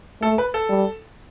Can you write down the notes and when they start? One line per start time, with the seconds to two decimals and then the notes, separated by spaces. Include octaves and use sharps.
0.22 A3 A4
0.38 B4
0.54 A4
0.70 G3